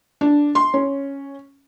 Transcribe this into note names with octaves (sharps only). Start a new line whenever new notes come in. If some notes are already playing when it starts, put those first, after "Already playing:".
D4
C6
C#4